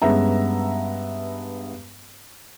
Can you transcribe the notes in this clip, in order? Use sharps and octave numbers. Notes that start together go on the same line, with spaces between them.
G2 G#3 B3 C#4 E5 A#5